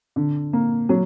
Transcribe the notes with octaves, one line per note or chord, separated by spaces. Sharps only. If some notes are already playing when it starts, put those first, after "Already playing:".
D3
A#3
F#3